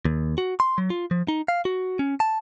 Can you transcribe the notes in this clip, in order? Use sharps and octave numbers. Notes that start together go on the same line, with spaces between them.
D#2
F#4
C6
F#3
F4
F3
D#4
F5
F#4
C#4
A5